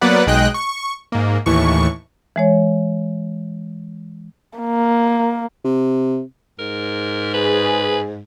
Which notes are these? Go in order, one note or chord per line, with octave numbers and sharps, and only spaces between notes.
F#3 A#3 B3 B4 D5 F#5
B1 G#3 D#5 G5 F#6
C#6
G#2 A#3
D#2 A2 E3 C#6
E3 G#3 C#5
A#3
C3
G#2 A#4
G#4 B4